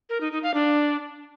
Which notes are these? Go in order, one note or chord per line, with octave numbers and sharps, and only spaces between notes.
A#4
D#4
D#4
F5
D4